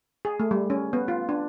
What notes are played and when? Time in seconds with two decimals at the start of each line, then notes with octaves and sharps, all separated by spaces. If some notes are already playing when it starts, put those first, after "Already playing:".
0.25 G#4
0.40 A3
0.51 G3
0.70 C#4
0.93 B3
1.08 F4
1.29 D4